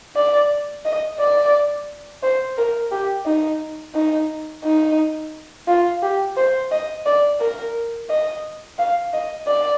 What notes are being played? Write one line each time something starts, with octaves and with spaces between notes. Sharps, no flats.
D5
D#5
D5
C5
A#4
G4
D#4
D#4
D#4
F4
G4
C5
D#5
D5
A#4
D#5
F5
D#5
D5